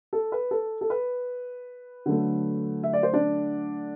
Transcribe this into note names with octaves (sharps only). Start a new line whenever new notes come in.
A4
B4
A4
A4
B4
D3 F#3 A3
E5
D5
C5
D4 D5